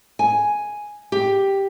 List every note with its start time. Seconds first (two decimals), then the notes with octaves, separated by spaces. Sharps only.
0.19 G#5
1.12 G4